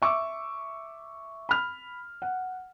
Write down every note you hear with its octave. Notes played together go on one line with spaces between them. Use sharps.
E5 C#6 D6 E6
B5 F6
F#5